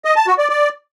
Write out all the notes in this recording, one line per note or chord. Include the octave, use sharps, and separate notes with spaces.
D#5
A5
F#4
D5
D5